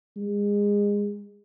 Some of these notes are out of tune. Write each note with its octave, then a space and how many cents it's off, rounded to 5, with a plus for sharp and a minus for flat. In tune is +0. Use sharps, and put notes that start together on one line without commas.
G#3 -25